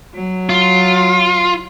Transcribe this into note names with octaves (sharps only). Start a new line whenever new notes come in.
F#3
F4